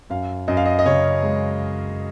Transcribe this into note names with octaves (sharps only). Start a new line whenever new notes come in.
F#2 F5
F#2 D#5
F5
D#5
D#5
C#3 C#5
G#3